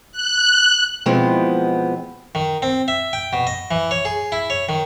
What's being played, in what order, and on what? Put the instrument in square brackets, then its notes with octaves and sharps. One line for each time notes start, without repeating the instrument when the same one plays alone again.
[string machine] F#6
[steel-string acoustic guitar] B2 E3 F3 G#3 B3 C4
[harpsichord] D#3
C4
E5
G5
B2
D#5
E3
C#5
G#4
E4
C#5
D#3